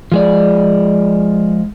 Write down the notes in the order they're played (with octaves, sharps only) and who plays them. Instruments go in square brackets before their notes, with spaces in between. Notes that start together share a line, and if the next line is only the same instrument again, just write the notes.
[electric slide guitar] F3 G#3 D5